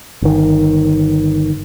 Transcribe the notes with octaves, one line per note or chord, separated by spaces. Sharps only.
G1 D#3